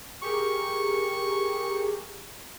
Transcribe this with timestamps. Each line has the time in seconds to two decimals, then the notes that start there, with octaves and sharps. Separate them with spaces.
0.22 G4 G#4 A#4 C#6